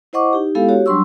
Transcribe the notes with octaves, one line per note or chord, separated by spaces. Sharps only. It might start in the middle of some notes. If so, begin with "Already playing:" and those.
E4 C5 D#5 F#5 C#6 D6
D#4 G4
G#3 B3 E4 G4 A4 F5
F#4 G4 C#5
F#3 G3 D4 C6 C#6 E6